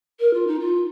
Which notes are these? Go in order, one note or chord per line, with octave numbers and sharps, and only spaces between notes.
A#4
F4
D#4
F4